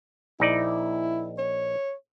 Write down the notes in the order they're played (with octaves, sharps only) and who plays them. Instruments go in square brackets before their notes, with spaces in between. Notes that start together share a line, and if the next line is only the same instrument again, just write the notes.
[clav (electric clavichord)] A#1 D#4 D5 [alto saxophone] E4
[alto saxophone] C#5